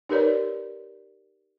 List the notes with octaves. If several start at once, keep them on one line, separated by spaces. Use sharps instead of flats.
D#4 G4 A#4 B4 C#5 D5